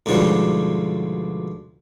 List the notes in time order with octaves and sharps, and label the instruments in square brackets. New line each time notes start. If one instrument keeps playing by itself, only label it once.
[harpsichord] D2 G#2 B2 F3 G3